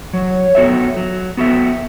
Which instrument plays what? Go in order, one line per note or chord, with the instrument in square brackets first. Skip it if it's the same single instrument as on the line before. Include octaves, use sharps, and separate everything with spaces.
[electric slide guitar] F#3 [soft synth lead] C#5
[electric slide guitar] B3 F#4 A4 E5
F#3
B3 F#4 A4 E5